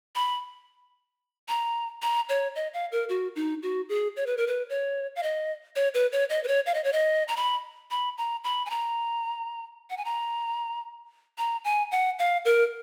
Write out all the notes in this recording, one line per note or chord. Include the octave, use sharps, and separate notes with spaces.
B5
A#5
A#5
C#5
D#5
F5
A#4
F#4
D#4
F#4
G#4
C#5
B4
A#4
B4
C#5
F5
D#5
C#5
B4
C#5
D#5
B4
C#5
F5
D#5
C#5
D#5
A#5
B5
B5
A#5
B5
G#5
A#5
F#5
G#5
A#5
A#5
G#5
F#5
F5
A#4